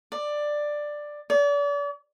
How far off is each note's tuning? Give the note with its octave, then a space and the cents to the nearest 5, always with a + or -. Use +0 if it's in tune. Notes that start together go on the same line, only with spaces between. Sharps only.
D5 +10
D5 -40